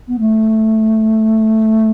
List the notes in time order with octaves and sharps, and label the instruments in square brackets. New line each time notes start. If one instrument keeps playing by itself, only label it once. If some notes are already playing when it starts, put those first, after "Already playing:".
[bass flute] B3
A3